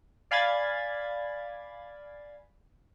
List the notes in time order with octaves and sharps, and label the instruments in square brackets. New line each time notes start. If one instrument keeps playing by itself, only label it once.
[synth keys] D5 F5 G#5 B5 G#6 A6